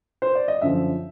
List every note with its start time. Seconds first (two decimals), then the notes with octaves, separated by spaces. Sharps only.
0.22 C5
0.35 D5
0.48 D#5
0.62 F#2 D3 F3 E5